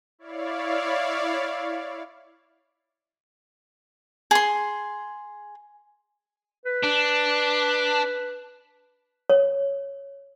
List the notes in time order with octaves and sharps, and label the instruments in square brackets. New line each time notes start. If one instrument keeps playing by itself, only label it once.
[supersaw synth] E4 C#5 D5 F5
[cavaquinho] G#4 C6
[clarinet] B4
[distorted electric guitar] D4
[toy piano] C#5